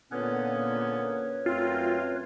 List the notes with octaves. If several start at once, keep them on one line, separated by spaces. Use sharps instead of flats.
A#2 D3 B3 C#4 B4 C#5
F#2 A3 C4 F4